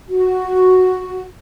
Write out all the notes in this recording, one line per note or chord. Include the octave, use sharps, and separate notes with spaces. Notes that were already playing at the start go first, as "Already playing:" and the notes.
F#4